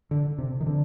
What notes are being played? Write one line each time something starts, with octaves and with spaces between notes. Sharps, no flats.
D3
C3
D#3
D3